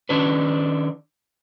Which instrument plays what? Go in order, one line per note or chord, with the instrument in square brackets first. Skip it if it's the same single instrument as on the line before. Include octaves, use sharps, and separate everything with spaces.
[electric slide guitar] D#3 C#4 D4 B4